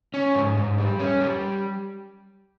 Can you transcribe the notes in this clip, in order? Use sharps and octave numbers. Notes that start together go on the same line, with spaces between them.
C#4
G#2
G#2
G3
C#4
G3